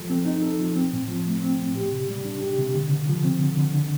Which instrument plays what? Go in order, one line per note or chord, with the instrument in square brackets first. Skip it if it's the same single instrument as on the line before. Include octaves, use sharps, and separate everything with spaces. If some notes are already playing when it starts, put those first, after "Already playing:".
Already playing: [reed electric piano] F3 A4
C4
D#4
A4
F3
C4
A2
F3
A3
C4
A2
G4
C3
G3
D4
G4
C3
D3
D3
F3
C4
D3
D3
D4